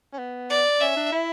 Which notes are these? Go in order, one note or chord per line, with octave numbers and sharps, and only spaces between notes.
C#4
B3
D5
C#4 E5
D4
E4